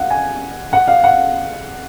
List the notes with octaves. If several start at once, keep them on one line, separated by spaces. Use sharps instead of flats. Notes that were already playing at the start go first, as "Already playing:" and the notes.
Already playing: F5 F#5
G#5
F#5
F5
F#5